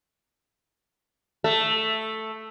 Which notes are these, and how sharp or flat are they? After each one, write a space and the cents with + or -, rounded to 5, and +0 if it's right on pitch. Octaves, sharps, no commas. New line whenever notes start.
A3 +0 E5 +10